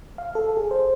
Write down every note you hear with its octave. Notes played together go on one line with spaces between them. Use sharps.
F5
A4
G#4
C5